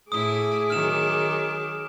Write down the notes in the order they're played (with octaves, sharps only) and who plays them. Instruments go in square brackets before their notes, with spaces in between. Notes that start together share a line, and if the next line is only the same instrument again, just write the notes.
[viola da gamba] A2 E4 [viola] G#4 D6 [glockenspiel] D#6
[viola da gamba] D#3 F#3 [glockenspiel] F6 E7